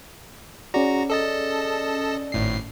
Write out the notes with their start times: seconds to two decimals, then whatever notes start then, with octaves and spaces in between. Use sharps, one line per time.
0.74 C#4 F#4 G#4 D5 A#5
1.10 A4 D#5 A5
2.32 G#1 A2 C7